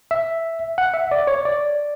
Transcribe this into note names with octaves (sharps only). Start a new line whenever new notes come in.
E5
F#5
E5
D5
C#5
D5